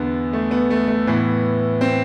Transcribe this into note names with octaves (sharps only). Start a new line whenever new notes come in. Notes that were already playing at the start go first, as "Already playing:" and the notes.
Already playing: E2 D3 B3
A3
B3
A3
A3
A2 E3 B3
C4